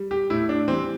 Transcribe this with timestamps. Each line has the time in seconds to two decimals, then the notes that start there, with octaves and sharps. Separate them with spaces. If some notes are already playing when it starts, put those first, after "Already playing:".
Already playing: G3
0.11 G4
0.30 A2 E4
0.49 D4
0.68 E3 G3 C4